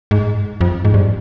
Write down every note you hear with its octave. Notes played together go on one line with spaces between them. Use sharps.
G#2
F2
G#2
G2